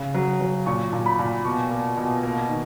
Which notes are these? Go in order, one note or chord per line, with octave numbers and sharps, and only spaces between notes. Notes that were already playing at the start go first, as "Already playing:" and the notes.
Already playing: C#3
F#3
F#3
A#2 C#6
A#2
B5
A#2
B2 C#6
A#3
B2
A#3
D#3